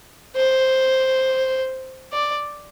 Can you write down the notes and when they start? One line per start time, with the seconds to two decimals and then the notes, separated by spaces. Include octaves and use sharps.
0.36 C5
2.12 D5